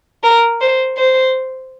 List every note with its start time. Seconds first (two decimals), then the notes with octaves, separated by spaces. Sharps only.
0.24 A#4
0.61 C5
0.98 C5